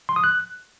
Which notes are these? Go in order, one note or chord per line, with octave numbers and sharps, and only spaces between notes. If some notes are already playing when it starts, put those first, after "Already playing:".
C6
D#6
F#6